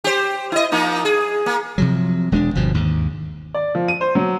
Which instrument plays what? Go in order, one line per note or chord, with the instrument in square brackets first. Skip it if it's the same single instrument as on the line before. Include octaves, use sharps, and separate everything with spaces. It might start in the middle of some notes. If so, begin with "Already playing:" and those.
[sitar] G4 C5
E4 D#5
F3 A#3 D#4
G#4
A#3
[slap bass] C3 F3 F#3
E1 G#3 C4 D4
G1 B2 F3
D#2 G#2
[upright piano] D5
F3
D#7
C5
F#3